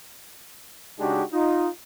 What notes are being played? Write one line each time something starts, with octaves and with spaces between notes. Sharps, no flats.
C#3 G#3 D4 D#4 F#4 G4
D#4 F4